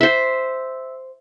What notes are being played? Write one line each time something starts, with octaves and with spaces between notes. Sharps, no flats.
C5 E5